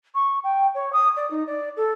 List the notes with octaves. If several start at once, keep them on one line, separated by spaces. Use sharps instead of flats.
C#6
G5
C#5
D#6
D5
D#4
D5
A4